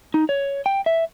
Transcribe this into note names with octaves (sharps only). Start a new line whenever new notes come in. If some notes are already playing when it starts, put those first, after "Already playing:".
D#4
C#5
G5
E5